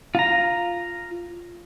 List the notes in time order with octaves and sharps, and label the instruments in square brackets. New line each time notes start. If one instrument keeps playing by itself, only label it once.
[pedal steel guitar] F4 A#5